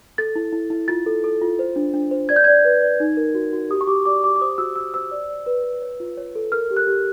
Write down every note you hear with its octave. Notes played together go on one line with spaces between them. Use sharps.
A4 A6
E4
E4
E4
F4 A6
A4
A4
F4
C5
D4
D4
C5
D5 G#6
G6
D5 G#6
B4
D5
D#4
A#4
F#4
F#4
G4 D#6
C#6
G4 D6
D5 D6
G4 D6
D6
C5 D#6
F#4 E6
F#4 E6
C5 E6
D5
D5
B4
B4
C#5
F4
C#5
A4
A#4 F6
G4
F#6
G4